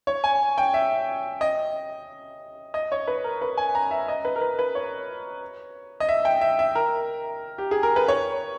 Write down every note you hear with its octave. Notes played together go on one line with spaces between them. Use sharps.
C#5
G#5
G5
E5
D#5
D#5
C#5
B4
A#4
B4
G#5
A#5
E5
D#5
B4
A#4
B4
B4
C#5
D#5
E5
G5
E5
E5
A#4
G4
G#4
A#4
B4
C#5